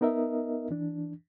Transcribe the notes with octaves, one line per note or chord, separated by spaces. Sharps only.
B3 D#4 A#4 D#5 E5
E3 D4